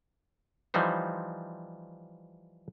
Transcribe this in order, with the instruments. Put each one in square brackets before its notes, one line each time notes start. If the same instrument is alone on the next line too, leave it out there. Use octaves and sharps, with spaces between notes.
[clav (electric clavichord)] E3 F3 G3 D#4 C5